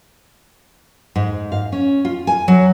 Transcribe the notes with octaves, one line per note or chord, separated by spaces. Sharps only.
G#2
F5
C#4
F4
G#5
F#3